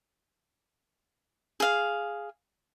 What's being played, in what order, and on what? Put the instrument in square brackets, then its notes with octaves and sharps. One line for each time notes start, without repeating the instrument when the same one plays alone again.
[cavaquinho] G#4 F5